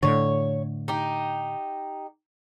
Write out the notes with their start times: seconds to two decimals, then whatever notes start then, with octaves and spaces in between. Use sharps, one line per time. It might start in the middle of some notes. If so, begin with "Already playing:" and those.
0.03 A2 D3 C#5
0.88 D#4 G4